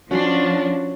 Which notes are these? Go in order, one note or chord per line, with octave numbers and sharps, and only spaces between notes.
F3 C#4 D4 F#4 B5 C6